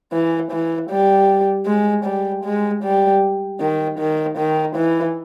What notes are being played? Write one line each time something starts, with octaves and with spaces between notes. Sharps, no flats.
E3
E3
G3
G#3
G3
G#3
G3
D#3
D#3
D#3
E3